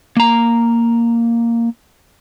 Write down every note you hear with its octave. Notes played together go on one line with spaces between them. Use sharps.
A#3 A#5